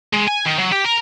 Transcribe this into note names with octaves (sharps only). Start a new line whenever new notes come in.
G#3
G#5
D#3
F#3
G4
A#4